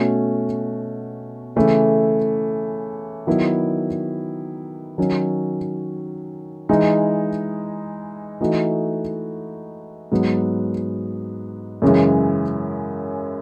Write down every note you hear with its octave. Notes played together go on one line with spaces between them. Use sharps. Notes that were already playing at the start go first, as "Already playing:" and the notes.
Already playing: B2 A3 C#4 F#4
C#3 E3 A3
D#3 F#3 B3 E4
D#3 F#3 C#4
E3 G#3 D#4
E3 A3 D#4 F#4
G#2 F#3 B3
F#2 C#3 E3 G#3